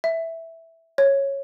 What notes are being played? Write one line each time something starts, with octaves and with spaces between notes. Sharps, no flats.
E5
C#5